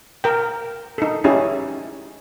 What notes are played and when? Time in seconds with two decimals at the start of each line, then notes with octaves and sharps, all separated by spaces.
0.24 A#4 G5
0.98 D#4 A4
1.24 C#4 D#4 E4 G4 G#4